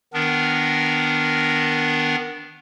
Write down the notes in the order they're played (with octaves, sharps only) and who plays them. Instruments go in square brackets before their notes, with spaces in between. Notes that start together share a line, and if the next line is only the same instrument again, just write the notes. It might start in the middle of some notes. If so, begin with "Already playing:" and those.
[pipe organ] D#3 B3 D4 A#4